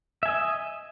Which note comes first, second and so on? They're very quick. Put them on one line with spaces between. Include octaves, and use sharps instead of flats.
E5 G#5 D#5